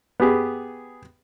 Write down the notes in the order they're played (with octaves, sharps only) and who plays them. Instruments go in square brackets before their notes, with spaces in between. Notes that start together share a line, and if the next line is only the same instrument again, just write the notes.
[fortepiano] B3 G4 G#4